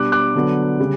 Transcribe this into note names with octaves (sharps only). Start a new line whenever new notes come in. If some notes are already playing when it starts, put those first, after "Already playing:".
Already playing: B2 G3 D4 D6 F#6
D6 F#6
D3 F#3 B3 D4
C#3 G3